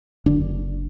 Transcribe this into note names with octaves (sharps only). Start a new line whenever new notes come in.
F#1 F#2 D3 D4